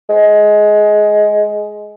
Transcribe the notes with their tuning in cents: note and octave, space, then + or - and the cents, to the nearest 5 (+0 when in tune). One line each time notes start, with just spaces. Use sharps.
G#3 +15